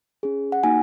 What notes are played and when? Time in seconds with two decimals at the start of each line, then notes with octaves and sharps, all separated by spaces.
0.23 C#4 G#4
0.52 F#5
0.63 A#3 D#4 F#4 G#5